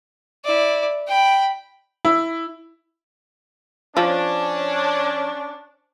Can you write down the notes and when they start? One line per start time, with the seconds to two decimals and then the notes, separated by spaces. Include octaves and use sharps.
0.44 E4 D5
1.07 G5 B5
2.05 E4
3.97 F3 C#4 D4